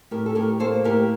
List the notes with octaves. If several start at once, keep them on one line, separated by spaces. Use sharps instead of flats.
A2 G4 A#4
A4
A2 G4 A#4
A#3 A4 C5
A2 G4 A#4